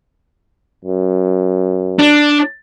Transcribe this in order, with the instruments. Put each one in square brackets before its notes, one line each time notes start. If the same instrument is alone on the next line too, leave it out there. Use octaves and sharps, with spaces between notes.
[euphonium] F#2
[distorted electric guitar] D4